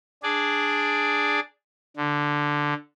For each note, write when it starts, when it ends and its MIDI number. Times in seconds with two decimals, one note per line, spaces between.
0.23 1.40 62
0.23 1.40 68
0.23 1.40 74
1.97 2.74 50